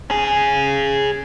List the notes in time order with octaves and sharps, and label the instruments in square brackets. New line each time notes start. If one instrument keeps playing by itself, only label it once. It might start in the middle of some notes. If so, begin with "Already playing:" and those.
[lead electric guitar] C#4 G#4